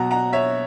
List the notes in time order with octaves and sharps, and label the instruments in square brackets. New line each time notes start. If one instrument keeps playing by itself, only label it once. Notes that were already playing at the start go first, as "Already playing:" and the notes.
Already playing: [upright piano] B2 F#3 F#5 A#5
F#5 A#5
C#5 E5